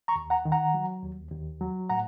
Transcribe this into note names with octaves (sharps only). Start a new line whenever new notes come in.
A#5 C#6
D#2
F#5 A#5
D#3
F#5 A#5
F#3
D#2
D#2
F#3
A2 F#5 A#5